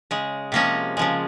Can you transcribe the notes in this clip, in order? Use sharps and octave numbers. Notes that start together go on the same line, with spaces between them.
C#3 G#3
C3 F3 G#3 A#3 C#4
C#3 F3 G#3